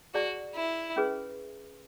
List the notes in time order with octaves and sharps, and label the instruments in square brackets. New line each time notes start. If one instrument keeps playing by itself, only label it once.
[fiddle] F#4 [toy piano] G#4 D5 A5
[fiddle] E4
[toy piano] C#4 G#4 B4